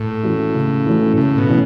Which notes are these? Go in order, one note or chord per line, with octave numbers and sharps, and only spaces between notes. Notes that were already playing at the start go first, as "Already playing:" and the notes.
Already playing: A2
E3 A3 C#4 F#4
C#3
E3 A3 C#4 F#4
A2 C#3
B2
E3 A3 C#4